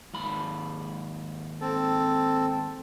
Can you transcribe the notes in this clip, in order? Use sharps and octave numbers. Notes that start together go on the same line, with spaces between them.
D#2 G#2 B5
C4 A4